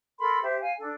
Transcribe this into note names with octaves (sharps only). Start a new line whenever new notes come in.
A4 A#4 B5 C6
G4 C5 E5
F5 G#5
D4 A4